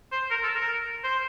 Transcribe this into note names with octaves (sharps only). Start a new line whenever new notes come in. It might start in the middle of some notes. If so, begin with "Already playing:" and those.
C5
A#4
A4
A#4
C5